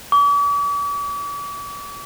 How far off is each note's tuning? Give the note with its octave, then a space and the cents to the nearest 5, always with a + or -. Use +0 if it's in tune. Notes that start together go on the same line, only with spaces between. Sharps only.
D6 -45